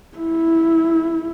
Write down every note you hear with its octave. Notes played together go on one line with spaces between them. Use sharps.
E4